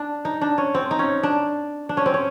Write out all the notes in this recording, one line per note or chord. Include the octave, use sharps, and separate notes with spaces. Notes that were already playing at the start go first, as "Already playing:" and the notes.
Already playing: D4
D#4
D4
C#4
C4
D#4
C#4
D4
D4
C#4
C4
C#4